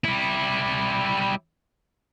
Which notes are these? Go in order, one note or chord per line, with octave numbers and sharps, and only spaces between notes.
G3 E4